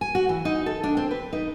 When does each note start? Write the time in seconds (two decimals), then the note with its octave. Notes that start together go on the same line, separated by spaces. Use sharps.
0.01 G#5
0.15 F#4
0.29 E3
0.45 D#4
0.66 A4
0.83 D4
0.97 C4
1.11 B4
1.33 D#4